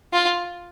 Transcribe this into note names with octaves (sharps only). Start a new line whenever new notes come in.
F4